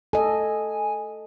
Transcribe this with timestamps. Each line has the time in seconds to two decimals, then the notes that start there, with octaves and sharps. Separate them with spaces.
0.13 A4 D#5 G#5